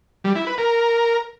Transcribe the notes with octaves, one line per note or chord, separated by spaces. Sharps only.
G3
E4
B4
A#4